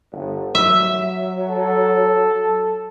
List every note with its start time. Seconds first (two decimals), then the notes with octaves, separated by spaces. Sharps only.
0.12 G1
0.55 F#3 E5
1.49 A4